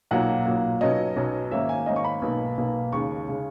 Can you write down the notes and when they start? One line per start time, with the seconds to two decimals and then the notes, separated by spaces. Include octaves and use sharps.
0.11 B1 A#2 F#3 A#3 F#5
0.45 B1 A#2 F#3 A#3
0.81 B1 B2 F#3 C#4 D#5
1.16 B1 B2 F#3 C#4
1.51 G#2 D#3 A#3 C#4 E5
1.69 G#5
1.86 G#2 D#3 A#3 C#4 D#5
1.96 C#6
2.04 B5
2.22 B1 B2 A#3
2.57 B1 B2 A#3
2.92 D#2 C#3 G#3 C#4 C#6
3.28 C#3 G#3 C#4